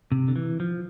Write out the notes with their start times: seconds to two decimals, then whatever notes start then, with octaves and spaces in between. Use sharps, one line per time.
0.12 C3
0.28 D3
0.36 E3
0.60 F3